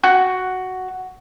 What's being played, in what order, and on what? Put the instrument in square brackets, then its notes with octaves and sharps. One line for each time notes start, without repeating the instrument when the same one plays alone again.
[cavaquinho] F#4